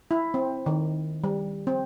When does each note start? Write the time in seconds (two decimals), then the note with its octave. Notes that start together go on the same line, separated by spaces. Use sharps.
0.11 E4
0.34 C4
0.66 D#3
1.24 G3
1.67 C4